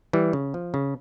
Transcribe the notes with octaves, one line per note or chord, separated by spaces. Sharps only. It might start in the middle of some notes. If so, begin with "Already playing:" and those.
E3 G3
C#3
F3
C#3